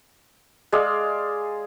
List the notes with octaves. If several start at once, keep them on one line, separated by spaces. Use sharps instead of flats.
G#3 G#4 D5 F5